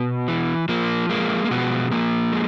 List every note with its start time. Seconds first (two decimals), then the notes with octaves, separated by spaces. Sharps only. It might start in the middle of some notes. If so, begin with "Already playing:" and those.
Already playing: B2 B3
0.28 E3
0.69 F3 A#3
1.10 G#3 A#3
1.45 A#3
1.51 B2 F3 B3
1.92 F3 A#3
2.32 G#3